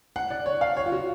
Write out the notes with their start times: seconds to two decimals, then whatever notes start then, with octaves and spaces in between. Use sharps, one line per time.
0.16 F#5
0.30 D5
0.46 C#5
0.61 F5
0.77 C#5
0.86 F4
0.92 F#4